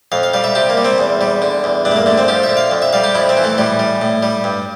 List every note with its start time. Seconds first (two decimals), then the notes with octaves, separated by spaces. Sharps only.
0.12 F2 F5
0.23 F5
0.34 G3 F5
0.44 E5
0.55 C3 G4
0.69 A#3
0.77 G3
0.85 C4
0.98 E2
1.21 G3
1.42 D3
1.64 E2
1.85 G2 D4
1.91 A3
1.96 A#3
2.06 D3 A3
2.18 C4
2.28 F3 G4
2.43 E5
2.49 D3
2.57 F5
2.71 F2
2.82 E5
2.93 G3 F5
3.04 G4
3.15 F2 E4
3.29 C4
3.37 E3
3.44 A3
3.58 A2 G3
3.79 G3
4.01 A2
4.23 G3
4.44 G2